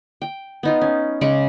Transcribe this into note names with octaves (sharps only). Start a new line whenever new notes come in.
G5
B3 D#4 F4
C#4
C#3 G#3 C#6 D6